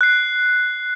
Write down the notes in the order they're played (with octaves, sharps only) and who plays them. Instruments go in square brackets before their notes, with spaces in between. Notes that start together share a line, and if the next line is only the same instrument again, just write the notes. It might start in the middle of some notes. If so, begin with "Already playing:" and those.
[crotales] F#6 C7